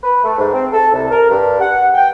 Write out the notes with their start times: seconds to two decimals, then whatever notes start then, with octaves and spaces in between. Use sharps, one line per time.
0.03 B4
0.23 A3
0.38 G#2
0.53 C4
0.72 A4
0.93 C2
1.10 A#4
1.29 G2
1.60 F#5
1.94 G5